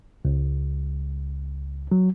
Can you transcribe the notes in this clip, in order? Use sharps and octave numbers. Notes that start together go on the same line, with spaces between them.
C#2
F#3